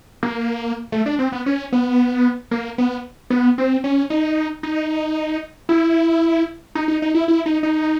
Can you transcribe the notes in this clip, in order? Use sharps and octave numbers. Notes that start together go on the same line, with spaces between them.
A#3
A3
D4
C4
B3
C#4
B3
A#3
B3
B3
C4
C#4
D#4
D#4
E4
D#4
D#4
D#4
E4
E4
D#4
D#4